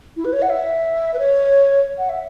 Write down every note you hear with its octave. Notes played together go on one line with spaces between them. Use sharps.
E4
B4
C#5
F#5
E5
B4
C#5
F#5
E5